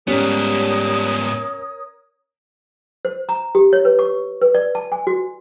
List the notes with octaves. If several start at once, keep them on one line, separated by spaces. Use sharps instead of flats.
G#2 G3 B3 C#4 A#4 C#5 D#6
C5
A#5
G4
C#5
B4
C#6
B4
D5
A5
G#5
F#4